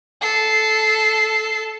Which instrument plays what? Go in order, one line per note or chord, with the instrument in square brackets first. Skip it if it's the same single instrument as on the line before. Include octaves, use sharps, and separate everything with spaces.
[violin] A4 C7